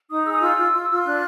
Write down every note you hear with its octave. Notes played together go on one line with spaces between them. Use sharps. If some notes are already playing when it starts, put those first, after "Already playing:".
D#4 D#6
G#4 E6
D#6
F4 E6
F4
F4
F4
D4 F#6